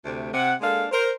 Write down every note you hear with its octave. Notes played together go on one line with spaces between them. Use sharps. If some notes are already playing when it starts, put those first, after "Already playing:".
D2 C3 A3
C3 F#5
G#3 A#3 D4 A4 F5
A#4 C5